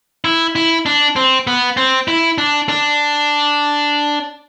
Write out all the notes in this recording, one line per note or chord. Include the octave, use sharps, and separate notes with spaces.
E4
E4
D4
C4
B3
C4
E4
D4
D4